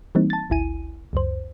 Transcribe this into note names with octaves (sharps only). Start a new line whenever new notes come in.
E3 G3 A#3 C4 D#4
A5 A6
G#1 D2 E4 G#5 D#7
C#2 F#2 C5